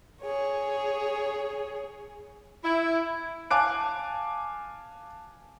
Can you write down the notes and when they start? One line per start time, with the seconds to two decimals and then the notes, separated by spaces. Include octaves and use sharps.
0.22 G#4 C#5
2.63 E4
3.51 F5 G#5 A5 D6 F#6 D7